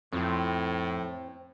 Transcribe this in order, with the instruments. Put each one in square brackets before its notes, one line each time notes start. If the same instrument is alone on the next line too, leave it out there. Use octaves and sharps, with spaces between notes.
[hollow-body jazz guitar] F2 [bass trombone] A2 [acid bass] C4